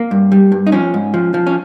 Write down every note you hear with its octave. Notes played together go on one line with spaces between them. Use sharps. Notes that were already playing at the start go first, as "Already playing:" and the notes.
Already playing: A#3
G2
G3
G2
D#4
F3 C#4
G#2
F3
F3
C#4